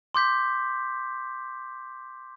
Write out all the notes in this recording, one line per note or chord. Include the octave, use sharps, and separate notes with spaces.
C6 D6 G6 B6